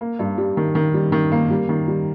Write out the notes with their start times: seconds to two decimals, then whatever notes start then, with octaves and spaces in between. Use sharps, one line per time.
0.01 A#3
0.19 G2
0.38 G3
0.57 D#3
0.75 D#3
0.94 G3
1.12 D#3
1.32 A#3
1.50 G3
1.69 D#3
1.88 G3